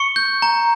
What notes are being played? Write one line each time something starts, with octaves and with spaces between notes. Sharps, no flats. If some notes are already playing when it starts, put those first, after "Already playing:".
Already playing: C#6 C#7
G6
A#5